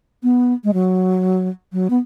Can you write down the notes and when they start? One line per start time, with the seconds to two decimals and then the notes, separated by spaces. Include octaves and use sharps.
0.23 B3
0.64 G#3
0.74 F#3
1.73 F#3
1.90 B3